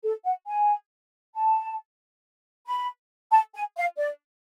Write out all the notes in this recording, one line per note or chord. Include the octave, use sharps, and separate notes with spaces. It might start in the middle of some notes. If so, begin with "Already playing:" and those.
A4
F#5
G#5
A5
B5
A5
G#5
F5
D5